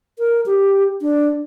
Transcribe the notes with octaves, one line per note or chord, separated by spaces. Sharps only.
A#4
G4
D4